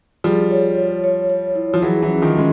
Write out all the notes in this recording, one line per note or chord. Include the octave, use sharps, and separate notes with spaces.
F3 G3 G#4
C#5
C#5
C#5
C#5
E4
F3
E3 F#3 G#4
E3 F#3
C#4
D#3 F3
G#3 C#4